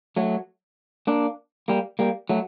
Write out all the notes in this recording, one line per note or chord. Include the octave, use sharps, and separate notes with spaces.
F#3 A3
A#3 D4
G3 A#3
G3 A#3
F#3 A3